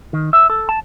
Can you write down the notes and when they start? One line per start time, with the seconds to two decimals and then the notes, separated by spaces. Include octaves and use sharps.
0.13 D#3
0.33 E5
0.50 A4
0.69 A5